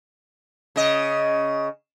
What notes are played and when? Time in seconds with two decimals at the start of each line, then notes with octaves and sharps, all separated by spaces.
0.76 C#3 D#5